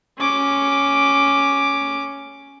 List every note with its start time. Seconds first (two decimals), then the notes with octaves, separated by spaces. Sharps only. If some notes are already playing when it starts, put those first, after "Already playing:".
0.19 C#4 D6